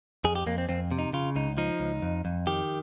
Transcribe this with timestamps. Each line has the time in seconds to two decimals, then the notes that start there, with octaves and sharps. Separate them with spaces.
0.24 F2 G#4
0.36 G4
0.46 F2 A#3
0.58 C4
0.69 F2 C4
0.91 C3
0.99 D#4
1.13 C#3 F4
1.36 C#2 D#4
1.58 F3 D#4
1.80 C#2
2.02 F2
2.25 F2
2.47 D#3 G4